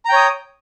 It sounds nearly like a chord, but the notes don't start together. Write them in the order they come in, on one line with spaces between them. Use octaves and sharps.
A#5 G5 C#5 D#6